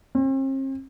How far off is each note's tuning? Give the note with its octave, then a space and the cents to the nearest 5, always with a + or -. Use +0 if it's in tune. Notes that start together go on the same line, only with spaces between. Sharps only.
C4 +45